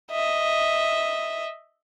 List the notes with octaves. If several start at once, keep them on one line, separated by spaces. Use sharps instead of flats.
D#5 E5